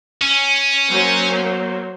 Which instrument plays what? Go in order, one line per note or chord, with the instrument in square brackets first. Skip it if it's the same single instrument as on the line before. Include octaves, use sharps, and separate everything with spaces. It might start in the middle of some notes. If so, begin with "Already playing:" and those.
[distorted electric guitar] C#4
[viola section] F#3 A#3 C5